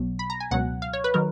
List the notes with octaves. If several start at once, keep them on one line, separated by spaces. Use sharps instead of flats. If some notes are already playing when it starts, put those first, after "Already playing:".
Already playing: B1 B2 F#3
B5
A#5
G#5
C#2 B2 F#3 F#5
F5
C#5
B4
D#3 F#3 A#4